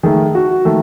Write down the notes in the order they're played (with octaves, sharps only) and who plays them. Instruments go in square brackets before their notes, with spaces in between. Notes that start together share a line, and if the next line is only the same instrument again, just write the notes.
[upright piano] D#3 A3 G#4
F#4
D#3 A3 A4